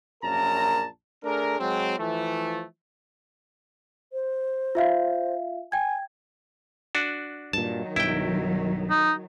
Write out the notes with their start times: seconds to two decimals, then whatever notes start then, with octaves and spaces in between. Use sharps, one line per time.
0.24 A#1 F#2 A#2 A#4 A5 A#5
1.24 A3 D4 G#4 A#4
1.60 F#3 G#3 C4
1.99 E3 F3 A3
4.13 C5
4.75 F4 E5 F5
5.72 G5 G#5 G#6
6.95 D4 F#4
7.53 G2 A#2 D#3 F#3 A5
7.96 B1 G2 E4 G5
8.90 D#4